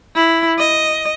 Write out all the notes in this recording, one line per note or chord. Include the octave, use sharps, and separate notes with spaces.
E4
D#5